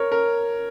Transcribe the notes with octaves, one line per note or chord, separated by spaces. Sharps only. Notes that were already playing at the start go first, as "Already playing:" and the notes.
Already playing: A#4 C#5
A#4